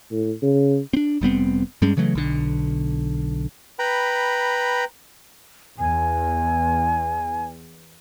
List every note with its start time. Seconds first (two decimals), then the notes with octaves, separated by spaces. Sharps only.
0.11 A2
0.42 C#3
0.93 C4 D4
1.21 F1 G3 B3 C4
1.82 G2 G3 G#3 C#4
1.97 C#3 E3 F#3 A3
2.15 B1 D3
3.79 B4 G5 A#5 B5
5.79 E2 G#5